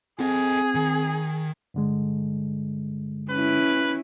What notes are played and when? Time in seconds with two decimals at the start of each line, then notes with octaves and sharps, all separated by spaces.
0.20 C4 G#4 A4 D#5
0.75 D#3
1.74 G2 D3 G#3
3.31 C#4 E4 B4